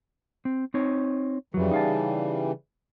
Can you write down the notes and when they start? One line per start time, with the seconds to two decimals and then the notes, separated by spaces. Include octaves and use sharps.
0.45 C4
0.74 C4 D#4 C#5
1.54 F2 C#3 E3 F#3 G3
1.71 D#4 F5 A5